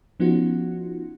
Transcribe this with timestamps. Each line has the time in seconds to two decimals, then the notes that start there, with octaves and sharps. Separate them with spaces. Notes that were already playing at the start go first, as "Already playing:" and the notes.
0.20 F3 B3 C#4 D#4 F4 F#4